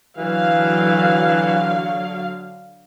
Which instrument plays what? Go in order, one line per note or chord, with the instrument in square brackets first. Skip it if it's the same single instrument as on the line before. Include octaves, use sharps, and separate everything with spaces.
[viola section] D3 F#3 F5 [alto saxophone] E3